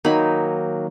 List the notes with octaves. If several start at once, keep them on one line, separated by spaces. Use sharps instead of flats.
D#3 F#3 A#3 D#4 B5